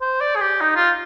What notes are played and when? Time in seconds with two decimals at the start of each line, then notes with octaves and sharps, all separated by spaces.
0.01 C5
0.21 D5
0.36 G#4
0.41 G4
0.61 D#4
0.76 F4